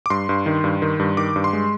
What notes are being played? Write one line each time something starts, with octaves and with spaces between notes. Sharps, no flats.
D6
G2 C6
G2
D#3
G2
D#3
G2
D#3 D6
G2
C6
G#3